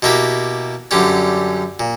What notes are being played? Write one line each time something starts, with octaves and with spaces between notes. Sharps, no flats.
B2 A#3 E4 G4
F#2 D3 G3 C#4
A#2